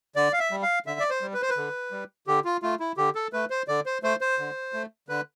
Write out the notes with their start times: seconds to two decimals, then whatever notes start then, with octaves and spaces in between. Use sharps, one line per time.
0.16 D3 D5
0.33 F5
0.39 E5
0.51 G3
0.63 F5
0.86 D3 E5
1.00 D5
1.10 C5
1.22 G3
1.34 B4
1.42 C5
1.50 B4
1.57 D3
1.92 G3
2.27 D3 G4
2.45 F4
2.62 A3 F4
2.80 E4
2.97 D3 G4
3.15 A4
3.33 A3 B4
3.50 C5
3.68 D3 D5
3.86 C5
4.03 A3 C5
4.21 C5
4.39 D3
4.73 A3
5.09 D3 B4